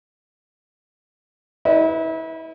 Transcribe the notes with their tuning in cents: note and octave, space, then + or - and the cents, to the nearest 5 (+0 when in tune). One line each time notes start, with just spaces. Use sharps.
E4 -35 B4 +0